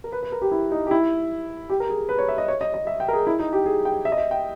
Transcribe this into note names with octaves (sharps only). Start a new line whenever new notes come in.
A#4
B4
B4
A#4
G4
E4
D#4
G4
E4
G4
A#4
G#4
B4
C#5
E5
D#5
C#5
D#5
D#5
E5
G5
A#4
G#4
E4
D#4
G4
G#4
G5
E5
D#5
E5
G5